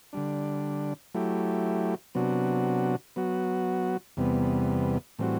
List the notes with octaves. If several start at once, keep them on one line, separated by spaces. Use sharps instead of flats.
D3 G3 D4
F#3 A3 E4 G4
C3 F#3 B3 D4 F#4
F#3 B3 F#4
E2 C3 G3 B3
A2 E3 G3 C4 F#4